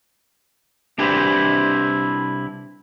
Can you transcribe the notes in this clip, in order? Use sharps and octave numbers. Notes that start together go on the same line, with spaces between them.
C2 D4 E4 G4 B4 C5